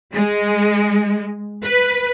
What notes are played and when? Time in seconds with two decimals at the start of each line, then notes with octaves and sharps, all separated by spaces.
0.14 G#3
1.64 B4